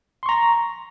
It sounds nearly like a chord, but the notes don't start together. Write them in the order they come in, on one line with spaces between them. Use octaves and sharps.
C6 C#6 A#5 A#6